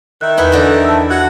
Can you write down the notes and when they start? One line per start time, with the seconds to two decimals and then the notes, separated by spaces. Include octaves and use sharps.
0.21 D#3 E5 F#6
0.37 E2 D#4 E4 B4 F#5
0.52 D3 E3
0.85 A5 E6
1.10 F#4 F#5 G#6